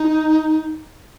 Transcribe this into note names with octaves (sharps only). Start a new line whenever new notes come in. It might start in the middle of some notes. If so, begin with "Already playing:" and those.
Already playing: D#4